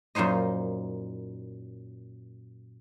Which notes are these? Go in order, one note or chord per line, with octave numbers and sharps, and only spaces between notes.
F#2 A#2 D#4 C5 D#5